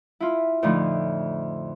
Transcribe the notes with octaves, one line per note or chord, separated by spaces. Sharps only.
E4 F4
F2 A2 D3 F3 A3 D#4